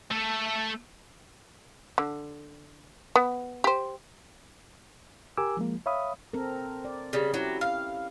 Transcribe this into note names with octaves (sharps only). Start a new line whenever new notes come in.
A3 A4
D3
B3
G4 C5
G4 A#4 G#5 D6 E6
F3 G#3 A#3
C#5 E5 F5 B5 D#6
C4 A4 A#4
D5
C#3 G3
F#3 C#4 E4 G4
F5